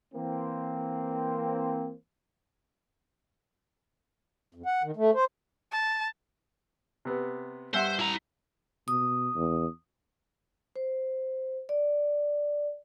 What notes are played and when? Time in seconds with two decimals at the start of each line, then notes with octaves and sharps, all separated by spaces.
0.14 E3 A#3 C4
4.54 F2
4.66 F#5
4.83 D#3
4.96 A3
5.14 C5
5.71 A5
7.05 C3 B3
7.74 G2 C5 E5 F#5
8.00 E4 A#5
8.88 B2 D#6
9.35 E2
10.76 C5
11.69 D5